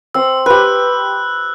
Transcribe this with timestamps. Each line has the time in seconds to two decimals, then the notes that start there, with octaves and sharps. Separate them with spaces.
0.14 C4 E6
0.46 G4 B4 F#6